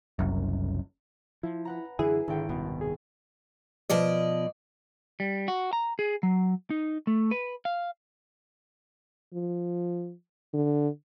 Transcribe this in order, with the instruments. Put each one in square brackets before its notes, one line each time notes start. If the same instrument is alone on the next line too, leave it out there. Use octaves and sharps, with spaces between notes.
[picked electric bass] F#1 C2 F#2
[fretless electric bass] F3 [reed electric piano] E4
[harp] B4 F#5 A#5
[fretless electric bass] F#2 D3 E3 [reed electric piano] E4 [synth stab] G#4
[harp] G#1 G5 [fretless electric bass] D3
[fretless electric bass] D#1 C2 B2 [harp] B3
[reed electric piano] G#4
[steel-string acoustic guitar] B2 F3 D5 D#5
[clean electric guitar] G3
F#4
A#5
G#4
F#3
D#4
A3
B4
F5
[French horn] F3
D3